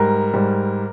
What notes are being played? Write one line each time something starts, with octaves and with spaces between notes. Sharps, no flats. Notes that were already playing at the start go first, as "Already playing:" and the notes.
Already playing: G#2 G3 A#4
G#2 G3